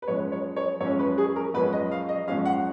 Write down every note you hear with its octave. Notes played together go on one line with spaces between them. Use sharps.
B4
F#2 F3 G#3 C#4 C#5
C#5
C#5
F#2 F3 G#3 C#4 C#5
B4
G#4
A#4
F#2 F3 G#3 C#4 B4
D#5
F5
D#5
F#2 F3 G#3 C#4 F5
F#5